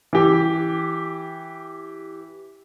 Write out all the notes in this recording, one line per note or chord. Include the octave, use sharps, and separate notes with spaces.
E3 G4